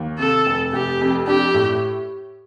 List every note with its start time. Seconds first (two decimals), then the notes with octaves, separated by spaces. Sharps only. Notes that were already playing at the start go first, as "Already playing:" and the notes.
Already playing: D#2
0.19 C3 A4
0.46 F1
0.73 F1 G4
1.01 F2
1.27 D4 G4
1.54 A2